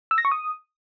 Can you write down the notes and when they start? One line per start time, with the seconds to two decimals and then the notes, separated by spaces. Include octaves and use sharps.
0.11 E6
0.18 A#6
0.25 C#6
0.32 D#6